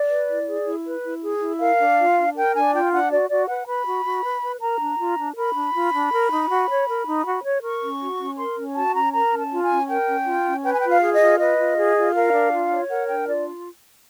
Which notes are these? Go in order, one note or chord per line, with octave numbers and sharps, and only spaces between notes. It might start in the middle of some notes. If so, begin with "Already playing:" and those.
Already playing: D5
B4
E4
G#4
E4
B4
E4
G#4
E4
A#4 F5
D4
F4
D4
A#4 G5
D4 G#5
F4 G5
D4 F#5
F#4 D5
F#4 D5
B4 F#5
B4 B5
F#4
F#4
B4
B4
A#4 A#5
D4
F4
D4
A#4 B5
D4
F4
D4
A#4
D#4
F#4
C#5
A#4
D#4
F#4
C#5
A#4 C#6
C#4
F#4
C#4
A#4 C6
C#4
F#4 A5
C#4 A#5
A#4 A#5
C#4
A5
F4
G#5
C#4
A#4 G5
C#4
F4
C#4
B4 G5
G#5
F4 G5
F5
G#4
D#5
F4
B4 D#5
F4
G#4
F4
A#4 F5
D4
F4
C#5
A#4 F#5
D4 G5
F4 D5